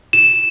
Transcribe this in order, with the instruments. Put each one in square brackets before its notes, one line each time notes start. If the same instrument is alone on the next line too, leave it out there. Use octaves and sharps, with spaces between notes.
[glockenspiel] E7